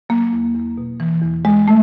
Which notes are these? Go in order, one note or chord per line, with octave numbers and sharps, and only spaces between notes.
F#3 A#3
E2
E2
B2
E3
E2
E2 G#3
A3